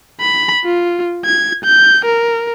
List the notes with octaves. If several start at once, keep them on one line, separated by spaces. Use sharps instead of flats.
B5
F4
G#6
G6
A#4